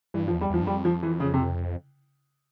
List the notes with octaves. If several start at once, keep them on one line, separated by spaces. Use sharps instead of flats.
G2 E3
F3
E2
G3
E2 F3
G2
F2 G3
F3
E3
C#3
C3